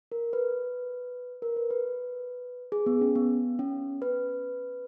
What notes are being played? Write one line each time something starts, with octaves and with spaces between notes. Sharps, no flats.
A#4
B4
A#4
B4
B4
G#4
B3
C#4
B3
C#4
B4